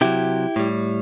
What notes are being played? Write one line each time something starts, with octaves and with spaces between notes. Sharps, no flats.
C3 F#3 E4 G4
A2 G3